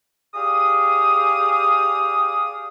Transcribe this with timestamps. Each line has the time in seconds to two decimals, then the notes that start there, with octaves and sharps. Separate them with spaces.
0.35 G4 G#4 D5 F5 D#6